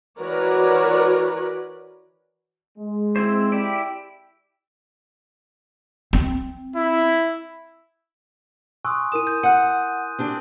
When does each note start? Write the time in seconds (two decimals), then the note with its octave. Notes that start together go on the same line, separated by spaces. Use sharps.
0.20 E3 F#4 A#4 B4 C#5 D5
2.78 G#3
3.16 C4 E4 C5
3.52 E4 G4 D5
6.13 C4
6.76 E4
8.85 G#5 C6 C#6 D#6 E6 F#6
9.12 E4 A#4 D#6 D#7 E7
9.27 G6
9.43 F#5 F#6 D#7
10.19 C4 D4 G4